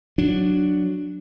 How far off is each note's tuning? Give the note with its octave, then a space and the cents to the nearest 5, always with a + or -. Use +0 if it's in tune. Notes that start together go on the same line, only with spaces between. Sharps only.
F#3 +0 D4 +0